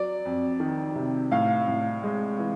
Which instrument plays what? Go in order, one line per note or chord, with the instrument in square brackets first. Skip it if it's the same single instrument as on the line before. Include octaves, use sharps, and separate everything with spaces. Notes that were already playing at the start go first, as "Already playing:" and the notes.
Already playing: [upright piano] F#3 D5
F2
D#3
C3
A2 F5
A2
G#3
E3